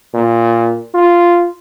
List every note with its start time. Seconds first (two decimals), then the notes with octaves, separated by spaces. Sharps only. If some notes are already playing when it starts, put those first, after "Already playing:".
0.14 A#2
0.94 F4